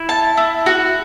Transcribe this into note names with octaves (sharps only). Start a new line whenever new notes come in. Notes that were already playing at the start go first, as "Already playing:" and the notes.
Already playing: E4
A5
E4
F#4